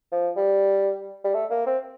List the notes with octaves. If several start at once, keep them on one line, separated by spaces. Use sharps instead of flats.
F3
G3
G3
A3
A#3
C4